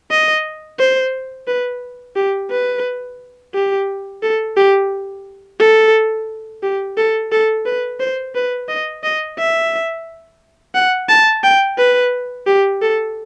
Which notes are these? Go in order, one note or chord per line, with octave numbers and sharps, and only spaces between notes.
D#5
C5
B4
G4
B4
G4
A4
G4
A4
G4
A4
A4
B4
C5
B4
D#5
D#5
E5
F#5
A5
G5
B4
G4
A4